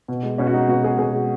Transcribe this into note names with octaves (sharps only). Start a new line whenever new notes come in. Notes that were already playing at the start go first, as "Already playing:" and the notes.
B2
G#3
B2 C#4
F#4
G#3 D#4
B2 F#4
G#3 G#4
B2 G#4
G#3